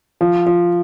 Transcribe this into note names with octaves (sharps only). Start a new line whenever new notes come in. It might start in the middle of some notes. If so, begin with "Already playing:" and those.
F3
F3